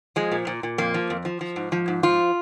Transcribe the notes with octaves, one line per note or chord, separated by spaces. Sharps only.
F3 G#3
A#2
A#2
A#2
F2 A#3
F3
F2
F3
F3
G#2
F3
G#2
F3 F4